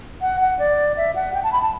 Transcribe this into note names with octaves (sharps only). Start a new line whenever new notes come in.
F#5
F#5
D5
E5
F#5
G5
A5
B5
A5